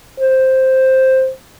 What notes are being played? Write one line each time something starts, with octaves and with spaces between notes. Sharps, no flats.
C5